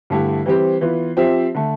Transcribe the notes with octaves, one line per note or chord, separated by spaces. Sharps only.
G2 D3 A3 E4 G4
E3 G3 C4 G4 C5
E3 B3 F4
F3 C4 G4 C5 E5
D3 A3